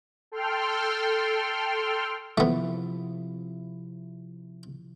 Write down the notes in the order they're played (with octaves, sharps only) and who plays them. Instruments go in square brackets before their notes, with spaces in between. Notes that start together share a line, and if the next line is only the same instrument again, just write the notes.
[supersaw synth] A4 G5 C6 F6
[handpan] C3 F3 E4 [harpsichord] A3 B3